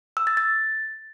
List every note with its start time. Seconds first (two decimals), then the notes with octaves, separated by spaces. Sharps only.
0.17 E6
0.27 A6
0.37 A6